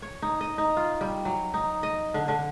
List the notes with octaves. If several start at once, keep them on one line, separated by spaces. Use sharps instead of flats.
C#5
D#4
D#5
D#4
F4
G3
F#3
D#4
D#5
D3
D3